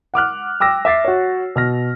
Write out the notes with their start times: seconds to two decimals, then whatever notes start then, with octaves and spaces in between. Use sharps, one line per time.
0.14 F#5 D6 F6 F#6
0.60 G5 D6 E6 A#6
0.85 E5 D6 A6 C7
1.05 F#4 C#5
1.56 B2 F6 A#6